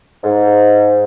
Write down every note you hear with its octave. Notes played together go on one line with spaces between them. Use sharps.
G#2